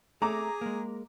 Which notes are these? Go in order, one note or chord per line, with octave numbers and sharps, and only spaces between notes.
A3 G#4 A#5 D6
G#3 A#3